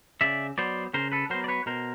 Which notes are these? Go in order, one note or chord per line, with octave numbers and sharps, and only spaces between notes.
C#3 D5 E5
F#3 B3 C5 D5
C#3 A#4 C5
A4 B4
F#3 B3 A#4 C5
D5
B4 C#5
B2 A#4 C5